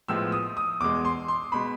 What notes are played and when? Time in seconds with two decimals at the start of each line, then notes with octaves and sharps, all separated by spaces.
0.08 A2 F3 G#3 B3 E6
0.32 D#6
0.57 D#6
0.80 E2 B2 G#3 D6
1.05 C6
1.28 C6
1.52 B2 G#3 B5